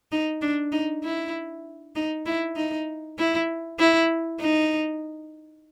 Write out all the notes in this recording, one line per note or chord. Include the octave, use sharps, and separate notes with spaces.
D#4
D4
D#4
E4
D#4
E4
D#4
E4
E4
D#4